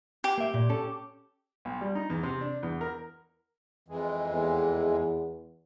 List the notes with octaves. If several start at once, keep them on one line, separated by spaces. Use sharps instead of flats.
G4
A#3 E5
A#2
C#4 A4
B1
G3
D#4
E2
C3
D4
E2
A#4
F2 E3 G#3
E2